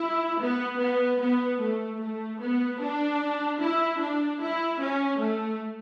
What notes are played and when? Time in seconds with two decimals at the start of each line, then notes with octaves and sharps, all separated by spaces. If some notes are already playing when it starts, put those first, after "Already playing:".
Already playing: E4
0.40 B3
0.80 B3
1.21 B3
1.61 A3
2.00 A3
2.40 B3
2.80 D4
3.60 E4
4.00 D4
4.40 E4
4.81 C#4
5.20 A3